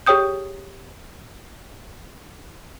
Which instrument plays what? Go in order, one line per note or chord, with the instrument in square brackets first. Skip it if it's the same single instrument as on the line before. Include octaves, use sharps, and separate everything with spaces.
[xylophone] G4 G#4 C#5 G5 D#6 G6